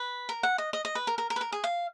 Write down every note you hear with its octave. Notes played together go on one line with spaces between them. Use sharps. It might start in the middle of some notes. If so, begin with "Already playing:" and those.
Already playing: B4
A#4
F#5
D#5
D#5
D#5
B4
A#4
A#4
A#4
B4
A#4
G#4
F5